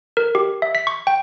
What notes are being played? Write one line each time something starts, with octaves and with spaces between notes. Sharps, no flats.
A#4
G4
E5
B6
C#6
G5